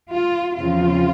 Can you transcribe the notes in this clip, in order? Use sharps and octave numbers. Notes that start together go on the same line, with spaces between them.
F4
E2 C#3 F3 C4 F4